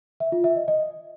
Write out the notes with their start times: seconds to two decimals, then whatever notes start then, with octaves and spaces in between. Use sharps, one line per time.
0.20 E5
0.32 F4
0.44 E5
0.56 D#5
0.68 D#5